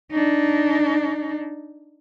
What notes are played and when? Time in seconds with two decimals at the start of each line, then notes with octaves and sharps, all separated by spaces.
0.11 D4 D#4